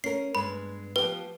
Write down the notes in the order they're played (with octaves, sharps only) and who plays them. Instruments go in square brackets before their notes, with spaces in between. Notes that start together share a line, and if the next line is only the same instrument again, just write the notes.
[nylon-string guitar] C#4 A#4 [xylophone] C7
[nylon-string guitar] G2 G#3 B3 [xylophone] B5
[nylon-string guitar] F3 B3 G4 [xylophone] B4